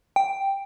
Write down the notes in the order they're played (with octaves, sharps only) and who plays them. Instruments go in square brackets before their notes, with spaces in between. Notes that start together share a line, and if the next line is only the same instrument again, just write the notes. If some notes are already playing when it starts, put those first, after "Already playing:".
[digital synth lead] G5